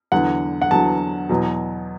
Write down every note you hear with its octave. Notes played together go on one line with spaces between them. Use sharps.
E2 D3 F#3 F#5
F#5
E2 D3 F#3 A5
E2 B2 F#3